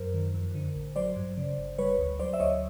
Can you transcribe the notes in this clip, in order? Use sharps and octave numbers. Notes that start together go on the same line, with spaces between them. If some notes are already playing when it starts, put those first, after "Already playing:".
Already playing: F#2 A#4 C5
D#3
F2
D3
A1
F#3 C5 D5
G2
C#3
G1
G3 B4 C#5
D2
F#3 C5 D5
E5
D2 C#5 D#5